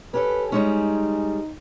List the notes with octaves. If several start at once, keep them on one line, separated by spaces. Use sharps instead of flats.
C#4 G4 A4 B4
G3 G#3 C#4 D#4